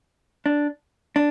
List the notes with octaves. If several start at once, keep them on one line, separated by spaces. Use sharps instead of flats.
D4
D4